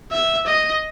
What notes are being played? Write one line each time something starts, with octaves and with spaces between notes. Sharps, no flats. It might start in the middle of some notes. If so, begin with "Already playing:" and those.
E5
D#5